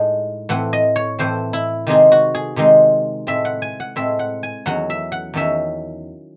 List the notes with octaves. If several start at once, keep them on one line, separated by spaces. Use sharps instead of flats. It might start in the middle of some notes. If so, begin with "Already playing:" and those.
Already playing: A2 G#3 D#4
A2 E3 C4 F#5
D#5
C#5
A2 E3 C4 C5
E4
C3 D#3 G#3 C4 D#4 G#4
F#4
G#4
C3 D#3 G#3 C4 D#4
A2 G#3 C4 E5
F#5
G#5
F#5
A2 G#3 C4 E5
F#5
G#5
E2 D#3 F#3 C#4 F#5
E5
F#5
E2 D#3 F#3 C#4 E5